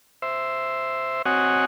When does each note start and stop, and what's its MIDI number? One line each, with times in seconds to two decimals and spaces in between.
0.22 1.22 72
0.22 1.22 76
1.26 1.65 60
1.26 1.65 66
1.26 1.65 73
1.26 1.65 75
1.26 1.65 78
1.26 1.65 80